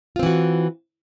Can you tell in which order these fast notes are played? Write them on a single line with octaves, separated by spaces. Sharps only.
F4 C4 E3 F#4